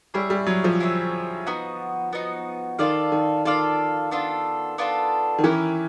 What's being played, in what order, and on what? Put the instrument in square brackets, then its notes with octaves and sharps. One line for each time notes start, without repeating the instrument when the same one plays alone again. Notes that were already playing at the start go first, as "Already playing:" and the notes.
[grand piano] G3 [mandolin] E4 G#4 C#5 E5
[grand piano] G3
F#3
F3
[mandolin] E4 G#4 C#5 E5
B3 D#4 F#4
B3 D#4 F#4
[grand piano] D#3 [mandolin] F4 A4 D5 F5
[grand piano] D#3
[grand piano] D#3 [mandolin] F4 A4 D5 F5
[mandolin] B3 D4 F4 A4
B3 D4 F4 A4
[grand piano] D#3
[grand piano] E3 [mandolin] C#4 E4 G4 A#4